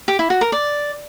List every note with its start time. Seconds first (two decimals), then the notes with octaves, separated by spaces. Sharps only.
0.08 G4
0.19 E4
0.30 F#4
0.41 A#4
0.52 D5